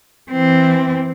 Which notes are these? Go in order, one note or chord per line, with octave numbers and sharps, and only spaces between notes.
E3 C4